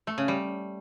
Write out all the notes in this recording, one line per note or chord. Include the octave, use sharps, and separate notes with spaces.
A3
C#3
G3